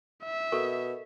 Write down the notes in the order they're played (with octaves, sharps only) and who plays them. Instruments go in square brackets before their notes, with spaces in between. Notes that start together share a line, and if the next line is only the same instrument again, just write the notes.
[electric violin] E5
[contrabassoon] B2 [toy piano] A4 A#4 C#6